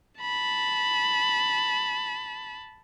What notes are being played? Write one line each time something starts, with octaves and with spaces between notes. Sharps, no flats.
A5 B5